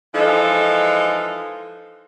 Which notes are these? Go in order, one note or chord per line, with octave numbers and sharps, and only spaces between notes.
E3 F3 G#3 D#4 A4